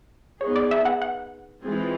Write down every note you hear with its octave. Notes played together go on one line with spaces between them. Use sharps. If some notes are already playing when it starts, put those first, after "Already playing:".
B3 D#4 G#4 C#5
D5
E5
F#5
F#5
E3 G#3 C4 F4 G#4